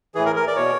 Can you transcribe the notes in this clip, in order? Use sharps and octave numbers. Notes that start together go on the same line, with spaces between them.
A2 E3 G#4
A#4
A#4
D5
B2 C#5